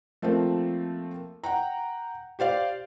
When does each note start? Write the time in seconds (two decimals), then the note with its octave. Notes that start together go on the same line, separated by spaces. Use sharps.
0.22 F3 A3 A#3 C4
1.44 F#5 G5 A#5
2.39 G4 C5 D5 F5